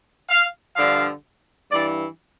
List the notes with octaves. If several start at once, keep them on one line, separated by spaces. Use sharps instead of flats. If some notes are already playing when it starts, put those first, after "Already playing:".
F5
G2 D3 F3 F5
G2 E3 D5